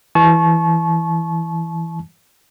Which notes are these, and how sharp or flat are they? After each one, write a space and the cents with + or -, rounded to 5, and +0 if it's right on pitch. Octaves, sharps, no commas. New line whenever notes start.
E3 +0 A5 -40 C#6 -10